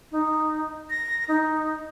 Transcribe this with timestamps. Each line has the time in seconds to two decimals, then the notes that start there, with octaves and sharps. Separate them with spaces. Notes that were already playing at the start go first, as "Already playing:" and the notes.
0.11 D#4
0.90 A#6
1.28 D#4